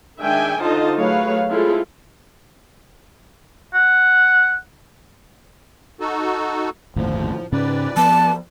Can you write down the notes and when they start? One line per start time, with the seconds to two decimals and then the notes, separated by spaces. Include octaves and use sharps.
0.19 D#3 G#3 D4 E5 G5 G#5
0.59 D3 D#4 F4 C5 D#5 A5
0.97 F#3 A3 G#4 B4 C#5 F5
1.50 G#3 C4 E4 F4 G#4 A4
3.74 F#5
6.00 D#4 F#4 A4
6.96 G1 D#2 A2 F3
7.52 G#2 C#3 C#4 B4 D5
7.96 F3 B3 A5